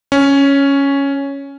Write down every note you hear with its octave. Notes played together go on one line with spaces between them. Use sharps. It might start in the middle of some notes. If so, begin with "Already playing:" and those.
C#4